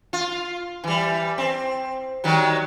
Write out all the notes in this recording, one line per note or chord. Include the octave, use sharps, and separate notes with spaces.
F4
E3 G3
C4
D#3 F#3 G3